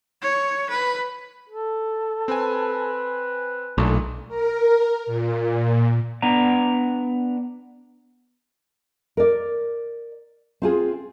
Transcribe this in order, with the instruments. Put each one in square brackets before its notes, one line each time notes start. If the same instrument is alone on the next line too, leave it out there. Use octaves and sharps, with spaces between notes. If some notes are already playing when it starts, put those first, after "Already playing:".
[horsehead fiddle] C#5
B4
[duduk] A4
[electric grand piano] C4 G#5 [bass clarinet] B4
[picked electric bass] B1 [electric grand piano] A#2 A3 D4
[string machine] A#4
A#2
[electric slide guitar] B3 D4 A#5
[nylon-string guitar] A#4 D5
C4 F4 G#4